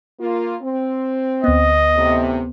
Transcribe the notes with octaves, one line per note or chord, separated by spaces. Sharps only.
A#3 F4
C4
D2 B3 D#5
E2 A2 C3